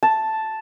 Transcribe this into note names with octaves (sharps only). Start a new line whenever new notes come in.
A5